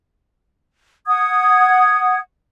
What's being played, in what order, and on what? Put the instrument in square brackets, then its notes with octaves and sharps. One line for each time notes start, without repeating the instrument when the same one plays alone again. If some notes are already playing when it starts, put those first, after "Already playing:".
[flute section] F#5 D#6 G#6